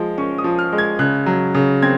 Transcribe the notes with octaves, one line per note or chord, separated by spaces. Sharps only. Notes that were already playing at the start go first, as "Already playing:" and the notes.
Already playing: F3 G#3
C#4 C#6
D#6
F3
F6
G#3
G#6
C#3 F#6
F#3
C#3
C4 G#6